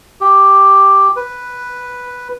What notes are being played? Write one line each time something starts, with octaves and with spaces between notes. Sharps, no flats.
G4
B4